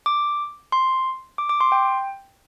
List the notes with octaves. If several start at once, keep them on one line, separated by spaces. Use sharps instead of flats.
D6
C6
D6
D6
C6
G5